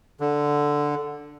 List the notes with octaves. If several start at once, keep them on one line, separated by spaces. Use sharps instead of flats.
D3